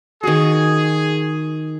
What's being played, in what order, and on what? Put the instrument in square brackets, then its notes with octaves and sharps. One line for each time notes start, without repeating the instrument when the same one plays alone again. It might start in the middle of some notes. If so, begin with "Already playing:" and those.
[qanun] D#3 F#4 [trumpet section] G#4